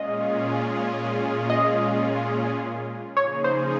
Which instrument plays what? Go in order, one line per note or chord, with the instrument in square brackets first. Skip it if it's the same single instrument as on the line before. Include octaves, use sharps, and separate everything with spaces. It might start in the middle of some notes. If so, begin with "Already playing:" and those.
Already playing: [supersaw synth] A#2 G#3 C#4 F4 G#4 [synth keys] D#5
[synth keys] D#5
[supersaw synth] C#3 F3 A#3 D#4 G#4 [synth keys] C#5
[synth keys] C5